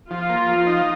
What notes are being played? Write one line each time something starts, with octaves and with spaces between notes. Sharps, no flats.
F3 F4
A#3
F3
D#4